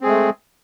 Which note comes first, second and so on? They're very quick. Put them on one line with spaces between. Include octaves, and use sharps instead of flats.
C4 G#4 G#3 A3